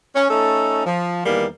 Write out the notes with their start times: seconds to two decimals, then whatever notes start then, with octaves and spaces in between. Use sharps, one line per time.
0.15 C#4
0.30 A3 C#4 D#4 A4
0.86 F3
1.25 E2 D#3 G3 A#3